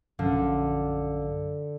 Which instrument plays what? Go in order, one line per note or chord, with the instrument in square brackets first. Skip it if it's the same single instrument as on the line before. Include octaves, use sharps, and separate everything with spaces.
[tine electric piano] A#1 F#2 F5 [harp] D3